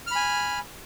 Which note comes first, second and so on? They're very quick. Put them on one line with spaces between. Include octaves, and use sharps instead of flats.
F6 B5 G#5